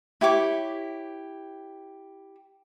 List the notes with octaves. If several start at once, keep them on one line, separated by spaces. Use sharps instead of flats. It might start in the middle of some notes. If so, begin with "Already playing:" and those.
E4 G4 C#5 D6